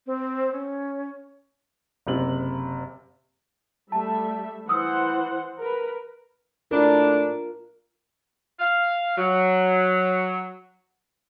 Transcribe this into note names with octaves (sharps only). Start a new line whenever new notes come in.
C4
C#4
F#1 C3 F#7
G3 A3 E5 A5
E3 C5 F#5 D#6 E6
A#4 B4
A2 D4 F4 A#4
F5
F#3